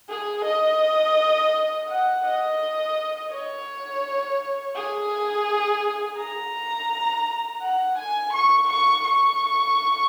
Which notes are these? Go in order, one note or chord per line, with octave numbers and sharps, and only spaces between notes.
G#4
D#5
F#5
D#5
C#5
G#4
A#5
F#5
G#5
C#6
C#6
C#6